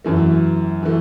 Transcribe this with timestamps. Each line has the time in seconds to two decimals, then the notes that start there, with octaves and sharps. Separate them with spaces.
0.05 F#2 E3 A3
0.83 E3 A3